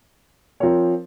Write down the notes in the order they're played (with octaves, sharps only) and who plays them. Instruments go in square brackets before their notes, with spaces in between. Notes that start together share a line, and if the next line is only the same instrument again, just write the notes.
[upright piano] F3 C4 F4 A#4 C#5